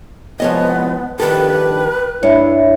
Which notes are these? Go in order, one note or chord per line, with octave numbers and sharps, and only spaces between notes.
C2 E3 F3 G#3 B3 C#5 D#5
A#1 G2 D#3 G4 A4 B4
G2 D4 E4 C#5 E5